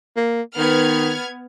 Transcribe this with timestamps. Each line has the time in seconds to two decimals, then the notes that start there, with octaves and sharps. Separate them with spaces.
0.16 A#3
0.57 D#3 B3 F6 G#6